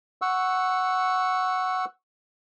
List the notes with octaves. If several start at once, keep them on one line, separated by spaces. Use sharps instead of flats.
F#5 C#6 E6